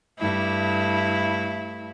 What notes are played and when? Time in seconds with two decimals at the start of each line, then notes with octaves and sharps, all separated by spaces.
0.18 G2 A3 E4